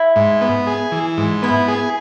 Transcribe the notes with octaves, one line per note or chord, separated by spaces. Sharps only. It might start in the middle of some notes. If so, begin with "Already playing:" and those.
Already playing: E4
G#2
B3
G#4
E3
G#2
B3 E4
G#4